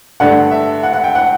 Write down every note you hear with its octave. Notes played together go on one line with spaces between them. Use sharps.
G2 D3 A3 D4 F#5
E5
F#5
F#5
G5
F#5